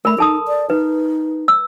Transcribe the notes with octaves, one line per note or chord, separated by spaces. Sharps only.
A3 A#4 B5
D#4 A4 A5 D#6
D5
D#4 B4
E6